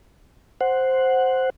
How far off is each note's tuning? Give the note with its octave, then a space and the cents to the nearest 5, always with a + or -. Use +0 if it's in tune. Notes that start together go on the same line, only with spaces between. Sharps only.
C5 +0 F#5 +0